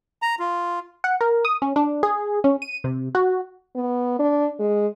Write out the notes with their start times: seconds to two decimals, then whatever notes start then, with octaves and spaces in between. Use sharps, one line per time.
0.22 A#5
0.39 F4
1.04 F#5
1.21 A#4
1.45 D#6
1.62 C#4
1.76 D4
2.03 G#4
2.44 C#4
2.62 D#7
2.84 C3
3.15 F#4
3.75 B3
4.19 D4
4.60 G#3